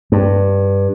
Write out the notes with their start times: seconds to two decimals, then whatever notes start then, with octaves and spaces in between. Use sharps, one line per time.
0.12 G2